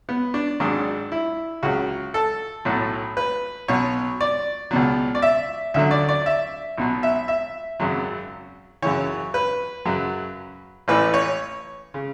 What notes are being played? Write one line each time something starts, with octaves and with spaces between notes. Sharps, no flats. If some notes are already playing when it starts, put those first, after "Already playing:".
B3
D4
G#1 G#2 F#3 D4
E4
C#2 C#3 F#3 F#4
A4
B1 A2 F#3
B4
B1 B2 F#3 C#5
D5
C#2 B2 F#3
D5
E5
D2 D3 F#3 E5
D5
D5
E5
B1 B2 F#3
E5
E5
G#1 F#2 C#3 F#3
F#2 C#3 E3 C#5
B4
F#2 C#3 F#3
A1 A2 E3 B4
C#5
C#3